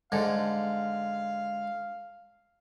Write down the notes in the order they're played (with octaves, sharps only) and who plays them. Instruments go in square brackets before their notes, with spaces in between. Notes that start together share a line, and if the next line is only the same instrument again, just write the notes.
[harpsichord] G#2 D3 [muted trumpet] F5